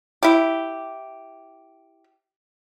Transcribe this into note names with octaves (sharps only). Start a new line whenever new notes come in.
E4 G4